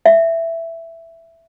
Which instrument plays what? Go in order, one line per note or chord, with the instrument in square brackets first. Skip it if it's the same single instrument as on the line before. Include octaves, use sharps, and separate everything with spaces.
[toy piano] E5